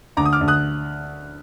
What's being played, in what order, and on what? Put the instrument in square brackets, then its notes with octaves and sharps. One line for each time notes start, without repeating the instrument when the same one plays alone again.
[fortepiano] D2 [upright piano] A#5 D6
[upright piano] D#6
D6 F6
[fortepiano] D2
[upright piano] D#6 F#6